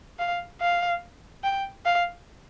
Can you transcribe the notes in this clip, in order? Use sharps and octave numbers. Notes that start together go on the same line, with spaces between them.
F5
F5
G5
F5